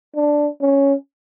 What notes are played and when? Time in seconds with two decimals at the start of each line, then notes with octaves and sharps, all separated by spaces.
0.15 D4
0.61 C#4